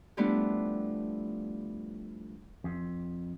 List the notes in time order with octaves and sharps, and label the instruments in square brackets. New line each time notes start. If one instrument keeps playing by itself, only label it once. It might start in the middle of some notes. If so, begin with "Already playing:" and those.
[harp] F3 G3 A3 B3 D4 E4
[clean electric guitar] F2